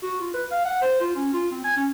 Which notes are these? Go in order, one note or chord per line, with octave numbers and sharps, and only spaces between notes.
F#4
F4
B4
F5
F#5
C5
F4
C#4
F4
C4
G#5
C#4